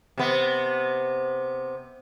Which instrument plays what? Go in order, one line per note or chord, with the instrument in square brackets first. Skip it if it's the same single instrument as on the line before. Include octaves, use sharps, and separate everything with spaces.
[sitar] C3 B3